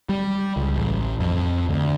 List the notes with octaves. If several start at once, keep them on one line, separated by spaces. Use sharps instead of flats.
G3
C#2
A1
F2
D2